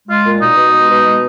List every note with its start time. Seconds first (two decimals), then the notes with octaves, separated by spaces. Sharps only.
0.09 G#3 F4
0.25 A#2
0.41 B2 D#4
0.57 B2
0.73 G#3
0.89 B2
1.06 G#3